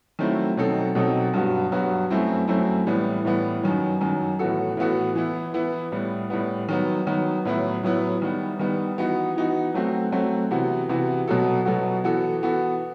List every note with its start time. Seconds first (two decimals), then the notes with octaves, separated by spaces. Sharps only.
0.19 D#3 F#3 A3 C4 E4
0.57 B2 F#3 C4 D#4 A4
0.95 B2 F#3 C4 D#4 A4
1.34 G2 F#3 B3 F#4
1.72 G2 F#3 B3 F#4
2.10 F#2 F#3 A3 C4 E4
2.48 F#2 F#3 A3 C4 E4
2.87 A2 E3 G3 B3
3.25 A2 E3 G3 B3
3.63 F#2 D#3 F#3
4.01 F#2 D#3 F#3
4.39 A2 E3 B3 F#4 A4
4.77 A2 E3 B3 F#4 A4
5.15 E3 B3 E4
5.54 E3 B3 E4
5.92 A2 G3 B3
6.30 A2 G3 B3
6.69 D#3 F#3 B3
7.07 D#3 F#3 B3
7.45 A2 F#3 B3 E4
7.83 A2 F#3 B3 E4
8.22 D#3 G3 B3
8.59 D#3 G3 B3
8.98 E3 B3 D#4 F#4
9.36 E3 B3 D#4 F#4
9.74 F#3 A3 C4 F#4
10.12 F#3 A3 C4 F#4
10.51 C3 E3 B3 F#4
10.89 C3 E3 B3 F#4
11.27 B2 F#3 B3 F#4 A4
11.66 B2 F#3 B3 F#4 A4
12.04 E3 B3 F#4 A4
12.42 E3 B3 F#4 A4